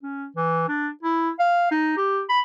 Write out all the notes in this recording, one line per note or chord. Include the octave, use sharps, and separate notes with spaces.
C#4
E3
D4
E4
F5
D#4
G4
B5